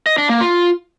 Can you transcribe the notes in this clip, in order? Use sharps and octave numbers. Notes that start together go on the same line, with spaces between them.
D#5
D4
A#3
F4